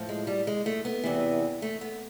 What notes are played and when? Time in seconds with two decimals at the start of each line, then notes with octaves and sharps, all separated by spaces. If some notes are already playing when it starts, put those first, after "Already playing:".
Already playing: A2 F3
0.09 G#3
0.27 G3
0.47 G#3
0.66 A3
0.85 B3
1.04 E2 C3 E3
1.62 A3
1.81 B3